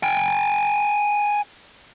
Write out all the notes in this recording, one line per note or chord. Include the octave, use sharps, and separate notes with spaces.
G5 G#5